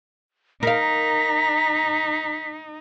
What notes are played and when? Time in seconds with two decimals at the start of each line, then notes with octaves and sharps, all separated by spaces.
0.63 D#4 A#4 F5 A#5 B6